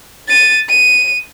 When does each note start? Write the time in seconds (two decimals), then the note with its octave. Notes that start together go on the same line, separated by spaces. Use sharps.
0.28 A6 D#7
0.68 D#7